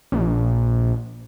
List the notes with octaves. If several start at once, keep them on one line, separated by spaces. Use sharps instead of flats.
A#1